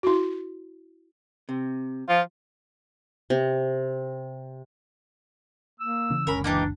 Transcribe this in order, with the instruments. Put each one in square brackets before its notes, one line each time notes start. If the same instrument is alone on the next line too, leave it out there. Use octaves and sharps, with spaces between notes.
[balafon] E4 F#4
[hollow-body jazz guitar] C3
[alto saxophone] F3 [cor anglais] F4
[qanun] C3
[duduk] A#3 [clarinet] E6
[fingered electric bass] C#3 E3 C#4
[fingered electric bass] F#1 C#2 D3 [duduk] C#4 [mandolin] A#4 B5
[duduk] E3 [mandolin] A#3 D#4 G4 [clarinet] D4